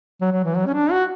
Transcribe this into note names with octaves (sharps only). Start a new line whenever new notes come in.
F#3
F#3
E3
F#3
C#4
D4
F#4